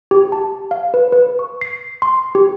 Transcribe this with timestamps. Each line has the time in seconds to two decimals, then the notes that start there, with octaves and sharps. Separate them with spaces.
0.11 G4
0.32 A5
0.71 F5
0.94 B4
1.12 B4
1.39 C#6
1.61 C7
2.02 C6
2.35 G4